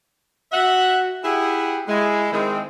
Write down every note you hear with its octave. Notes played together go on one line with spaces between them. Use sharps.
F#4 E5 F#5
E4 G4 G#4 F#5
G#3 E4
D#3 G#3 C4